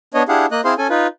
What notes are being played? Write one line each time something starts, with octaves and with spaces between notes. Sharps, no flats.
B3 D4 C#5 D#5
D4 E4 G4 G#4 F5 F#5
A#3 D#5 F#6
C4 E4 G#4 C5 F5 C6
C#4 A4 G#5
D#4 F4 B4